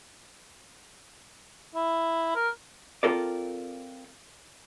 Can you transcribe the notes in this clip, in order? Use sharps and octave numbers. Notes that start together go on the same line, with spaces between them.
E4
A#4
C4 F4 A4 A#4 D5